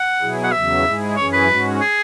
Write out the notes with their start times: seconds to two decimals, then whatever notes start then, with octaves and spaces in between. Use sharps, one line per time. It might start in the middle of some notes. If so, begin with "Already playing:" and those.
Already playing: F#5
0.20 B2 F#3 E4 G#4
0.44 F#5
0.52 E2 C#3 F#3 E5
0.84 G#2 G#3 E4 G#4
1.16 F#2 E3 C#4 G#4 C#5
1.33 B4
1.48 G#2 G#3 C#4 F#4
1.81 G#4